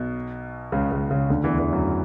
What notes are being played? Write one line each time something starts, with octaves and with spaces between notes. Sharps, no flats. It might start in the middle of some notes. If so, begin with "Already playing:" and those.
Already playing: B1 B2
C#2 C#3
C#2 C#3
C#2 C#3
D2 D3
E2 E3
E2 E3
F#2 F#3